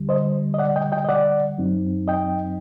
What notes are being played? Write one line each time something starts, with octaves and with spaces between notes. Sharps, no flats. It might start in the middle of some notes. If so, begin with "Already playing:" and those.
Already playing: D#2 D3 G3
C5 D#5
D#5
D5 F#5
D#5 G5
D#5 G5
D#5
D5 F#5
F#2 F#3 C4 D#4
D#5 G5